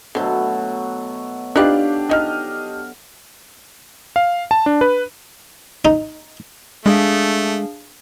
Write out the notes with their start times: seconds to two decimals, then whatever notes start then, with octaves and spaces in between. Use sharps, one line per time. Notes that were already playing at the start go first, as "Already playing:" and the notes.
0.15 B2 D3 F#3 A3 C5
1.56 D4 D#4 F4 G4 B4 F5 D6 F#6
2.09 F3 D#4 D#5 F6
4.16 F5
4.51 A5
4.66 D4
4.81 B4
5.85 D#4
6.86 G#3 A3 D4 G#4 F5